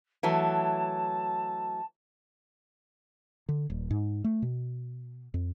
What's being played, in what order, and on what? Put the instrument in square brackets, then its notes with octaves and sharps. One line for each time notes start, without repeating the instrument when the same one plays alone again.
[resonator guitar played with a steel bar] E3 F#3 A3 [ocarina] A5
[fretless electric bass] D3
D#1
G#2
A3
B2
F2